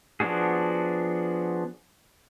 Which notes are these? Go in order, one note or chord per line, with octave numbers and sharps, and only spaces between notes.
F3 B3 D4 F#4 G#4